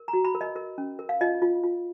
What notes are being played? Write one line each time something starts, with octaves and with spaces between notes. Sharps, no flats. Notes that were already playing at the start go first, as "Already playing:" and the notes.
Already playing: A#4
A#5
F#4
B5
A#4
D#5
A#4
C#4
A#4
F5
F4 D#5
F4
F4